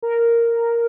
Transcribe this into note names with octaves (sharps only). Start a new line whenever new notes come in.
A#4